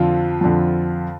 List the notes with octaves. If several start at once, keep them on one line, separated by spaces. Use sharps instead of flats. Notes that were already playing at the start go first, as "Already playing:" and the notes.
Already playing: F2 D3 F3 F4
F2 D3 F3